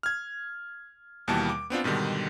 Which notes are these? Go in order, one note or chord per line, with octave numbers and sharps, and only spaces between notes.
F6 G#6
D#2 B2 E3 G3 A5
D6
B3 C4 D4 F4
G#2 B2 D3 D#3 G3